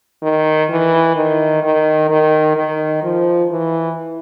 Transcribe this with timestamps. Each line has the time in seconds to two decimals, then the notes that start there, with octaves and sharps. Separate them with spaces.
0.22 D#3
0.70 E3
1.16 D#3
1.63 D#3
2.10 D#3
2.57 D#3
3.03 F3
3.50 E3